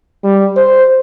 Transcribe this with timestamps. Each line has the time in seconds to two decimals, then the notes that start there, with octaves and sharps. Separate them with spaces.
0.24 G3
0.57 C5